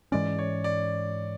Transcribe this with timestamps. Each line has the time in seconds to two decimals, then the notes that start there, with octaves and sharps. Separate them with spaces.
0.12 G#2 E3 G#3 C#4 D5
0.38 C#5
0.64 D5